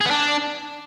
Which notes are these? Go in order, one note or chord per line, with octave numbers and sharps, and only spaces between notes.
G#4
B3
D4